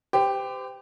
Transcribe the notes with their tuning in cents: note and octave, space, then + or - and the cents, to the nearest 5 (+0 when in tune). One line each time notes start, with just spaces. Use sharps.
G4 +5 C5 -40